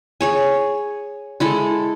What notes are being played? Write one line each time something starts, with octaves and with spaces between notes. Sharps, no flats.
G#4 C#5 G#5
G#3 E4 A4